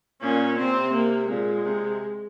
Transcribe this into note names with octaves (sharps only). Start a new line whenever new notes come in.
A#2 C#4
C3 C4
A#3
A#2 G#3
C3